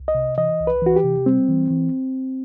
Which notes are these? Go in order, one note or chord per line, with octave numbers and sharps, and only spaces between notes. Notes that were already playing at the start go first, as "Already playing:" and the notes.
Already playing: C2
D#5
C3
E3 D#5
C2
B4
E3 F#4
G4
C3
G3 C4
E3
E3